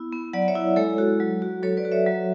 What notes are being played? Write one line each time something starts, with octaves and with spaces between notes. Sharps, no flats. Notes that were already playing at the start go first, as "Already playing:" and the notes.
Already playing: B3 E4
B3
F#3 D5 F#5
C#5 E5
E4
G#3 A4 C#5
F#4
F#3
F#4
F#3 A4 C#5
B4 D5
F#4
C#5 E5
F#3